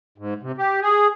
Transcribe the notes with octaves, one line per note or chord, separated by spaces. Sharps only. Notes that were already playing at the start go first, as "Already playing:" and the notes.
G#2
C3
G4
G#4